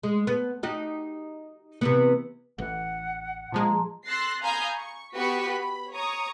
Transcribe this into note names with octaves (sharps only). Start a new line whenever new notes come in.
G#3
B3
D#4 F#4 G4
C3 E3 B3
A1 E3 F#5
A#2 F3 G#3 A5 A#5 C6
C6 E6 F#6 A6 A#6 C7
F5 G#5 A#5 B5 D#6 G6
C#6
B3 F#4 G4 B4 C#6 B6
B5
C#5 A#5 C#6 D#6